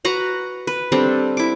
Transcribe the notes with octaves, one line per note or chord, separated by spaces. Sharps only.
F#4 B4 F#5 A#5
B4
G3 C4 D4 A4
E4 D6